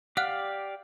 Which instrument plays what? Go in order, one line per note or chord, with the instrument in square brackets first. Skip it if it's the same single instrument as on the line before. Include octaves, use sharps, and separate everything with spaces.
[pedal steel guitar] G4 D5 F5 [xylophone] F#5 F6 F#6